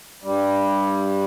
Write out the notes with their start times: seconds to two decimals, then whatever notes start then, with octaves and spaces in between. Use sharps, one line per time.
0.24 G2 G3